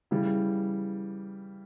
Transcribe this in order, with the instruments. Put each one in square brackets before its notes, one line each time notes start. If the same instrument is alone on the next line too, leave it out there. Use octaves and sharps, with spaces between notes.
[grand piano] C#3 E3 G3